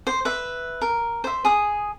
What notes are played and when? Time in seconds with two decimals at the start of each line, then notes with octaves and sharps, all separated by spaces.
0.07 C5
0.25 B4 E5
0.82 A#4
1.24 C5 E5
1.45 G#4 D#6